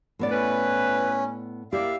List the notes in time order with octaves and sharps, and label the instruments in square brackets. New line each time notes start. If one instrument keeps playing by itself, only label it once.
[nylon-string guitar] A2 B3 D5
[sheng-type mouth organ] C#4 [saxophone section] E4 B4
[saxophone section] A#3 D5 [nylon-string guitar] E4 G4 [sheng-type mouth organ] E5 F5